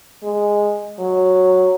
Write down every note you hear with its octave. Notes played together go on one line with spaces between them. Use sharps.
G#3
F#3